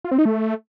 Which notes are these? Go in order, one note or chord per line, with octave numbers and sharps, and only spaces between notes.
F4
C4
D#4
A3